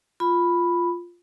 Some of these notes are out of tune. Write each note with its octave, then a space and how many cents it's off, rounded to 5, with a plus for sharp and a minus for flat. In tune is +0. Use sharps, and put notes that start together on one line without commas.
F4 +0 B5 +0